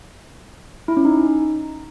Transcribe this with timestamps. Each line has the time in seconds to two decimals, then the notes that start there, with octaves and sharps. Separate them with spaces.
0.88 E4
0.97 C#4
1.05 D#4